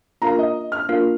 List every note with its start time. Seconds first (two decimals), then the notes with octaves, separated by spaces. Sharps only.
0.22 A#3 D4 F4 A#4 F5 A#5
0.39 D#5
0.72 F6
0.89 A#3 D4 F4 A#4 F5